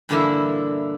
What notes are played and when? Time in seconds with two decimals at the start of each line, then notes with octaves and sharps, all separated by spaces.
0.09 G2 A#2 D3 E3 A#3 E4